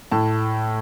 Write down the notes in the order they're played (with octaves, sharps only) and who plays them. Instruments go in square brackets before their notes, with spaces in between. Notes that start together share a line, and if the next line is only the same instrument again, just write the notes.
[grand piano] A2 A5